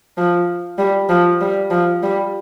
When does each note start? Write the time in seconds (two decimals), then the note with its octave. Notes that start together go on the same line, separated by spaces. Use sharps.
0.18 F3
0.78 G3
1.10 F3
1.41 G3
1.71 F3
2.03 G3